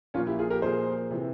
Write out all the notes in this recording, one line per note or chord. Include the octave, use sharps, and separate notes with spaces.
A#2 F3 C#4 F4
E4 G4
F4 G#4
G4 A#4
A#2 F3 G#4 C5
C3 E3